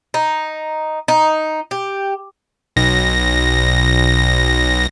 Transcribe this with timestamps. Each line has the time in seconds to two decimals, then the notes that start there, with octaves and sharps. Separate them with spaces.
0.14 D#4
1.08 D#4
1.71 G4
2.76 B1 A#6